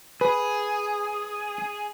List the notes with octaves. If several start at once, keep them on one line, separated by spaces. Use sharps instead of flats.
G#4 B4